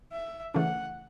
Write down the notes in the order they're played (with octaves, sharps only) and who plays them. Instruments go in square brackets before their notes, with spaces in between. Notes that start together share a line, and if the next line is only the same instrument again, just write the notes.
[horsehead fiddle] E5
[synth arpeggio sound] C#3 E3 A3 C#4 [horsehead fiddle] F#5